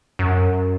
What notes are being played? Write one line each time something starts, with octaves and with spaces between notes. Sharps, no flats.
F#2